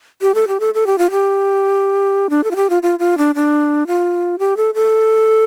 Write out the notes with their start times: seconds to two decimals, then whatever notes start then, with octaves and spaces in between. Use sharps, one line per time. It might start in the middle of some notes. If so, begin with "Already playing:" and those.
0.22 G4
0.35 A4
0.48 G4
0.60 A4
0.74 A4
0.87 G4
0.98 F4
1.11 G4
2.30 D4
2.44 A4
2.51 F4
2.56 G4
2.70 F4
2.83 F4
2.99 F4
3.18 D4
3.35 D4
3.87 F4
4.39 G4
4.57 A4
4.75 A4